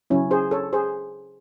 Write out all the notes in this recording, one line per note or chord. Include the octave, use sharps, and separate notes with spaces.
C#3 F#3 C#4 E4
G#4 C5
A4 C#5
G#4 C5